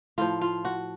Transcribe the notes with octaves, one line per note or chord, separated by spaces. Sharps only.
A2 F3 F4
F4
F#4